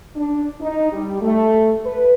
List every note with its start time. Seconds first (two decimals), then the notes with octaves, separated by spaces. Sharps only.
0.15 D4
0.59 D#4
0.91 G3
1.21 A3
1.84 B4